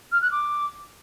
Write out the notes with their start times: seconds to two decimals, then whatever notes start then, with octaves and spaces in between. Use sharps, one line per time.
0.12 F6
0.22 F#6
0.32 D6